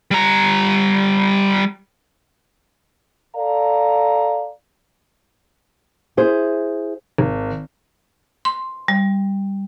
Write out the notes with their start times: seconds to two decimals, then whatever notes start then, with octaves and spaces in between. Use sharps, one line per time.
0.11 G3 A#5
3.36 A4 D5 F5 A#5
6.17 E4 G#4 C5
7.18 G#1
8.45 C6
8.88 G3